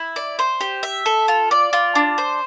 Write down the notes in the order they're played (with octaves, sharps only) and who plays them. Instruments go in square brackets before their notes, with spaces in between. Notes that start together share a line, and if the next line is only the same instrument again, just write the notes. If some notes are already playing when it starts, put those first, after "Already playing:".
Already playing: [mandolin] E4
D5
C5
G4
E5
A4
F4
D5
F4
D4
C5